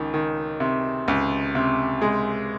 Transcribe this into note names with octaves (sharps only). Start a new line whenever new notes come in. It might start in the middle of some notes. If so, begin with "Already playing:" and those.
Already playing: C#2 D#3
D#3
C3
C#2
C3
G#3